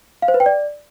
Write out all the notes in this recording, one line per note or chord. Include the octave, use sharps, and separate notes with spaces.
F5
C5
B4
G5
D5